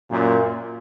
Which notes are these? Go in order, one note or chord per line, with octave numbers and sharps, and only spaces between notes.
F#2 A#2